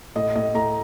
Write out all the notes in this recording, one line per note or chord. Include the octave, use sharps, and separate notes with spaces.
A2 D#5
A2 D#5
A2 A#5